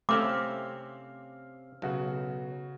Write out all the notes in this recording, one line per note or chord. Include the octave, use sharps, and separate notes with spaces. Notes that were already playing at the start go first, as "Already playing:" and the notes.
C3 A3 C4 C#4 F5 D6 E6 F6
B1 C#3 F#4